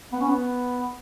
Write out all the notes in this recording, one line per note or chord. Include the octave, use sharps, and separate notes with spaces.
B3
C#4
B3